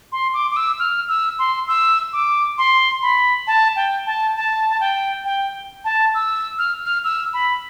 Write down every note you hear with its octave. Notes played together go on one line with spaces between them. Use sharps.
C6
D6
D6
E6
F6
E6
C6
E6
D6
C6
B5
A5
G5
A5
A5
A5
G5
G5
A5
E6
F6
F6
E6
B5